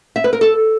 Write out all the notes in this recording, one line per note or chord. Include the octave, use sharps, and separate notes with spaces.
E5
B4
A#4
A4